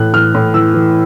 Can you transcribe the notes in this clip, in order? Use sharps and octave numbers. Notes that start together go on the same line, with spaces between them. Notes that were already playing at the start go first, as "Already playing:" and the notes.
Already playing: A2 E3 F#6
E3 F6
A2
E3 E6
E3